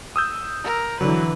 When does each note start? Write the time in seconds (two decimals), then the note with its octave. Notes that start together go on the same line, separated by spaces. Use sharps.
0.16 D#6 E6 G6
0.64 A#4
1.01 D3 E3 F#3 B4